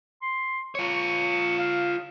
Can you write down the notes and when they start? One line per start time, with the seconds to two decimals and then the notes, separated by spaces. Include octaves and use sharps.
0.22 C6
0.75 F4 C#5 C#6
1.58 F5